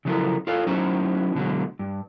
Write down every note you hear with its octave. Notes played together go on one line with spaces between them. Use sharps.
C#3 F3 F#3 E4 A4 A#4
F4 A4 C#5 F5
F#3 C#4 D#4 E4 F#4 C5
B2 D3 F#3 G#3
G2